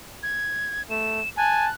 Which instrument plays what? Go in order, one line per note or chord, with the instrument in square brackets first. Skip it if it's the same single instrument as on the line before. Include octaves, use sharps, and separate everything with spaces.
[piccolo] G#6
[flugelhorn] A3 [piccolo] E7
[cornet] G#5 [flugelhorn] A5 [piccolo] F#6